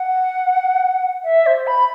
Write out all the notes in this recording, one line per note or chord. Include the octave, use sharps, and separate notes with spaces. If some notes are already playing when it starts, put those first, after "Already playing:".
Already playing: F#5
E5
C5
B5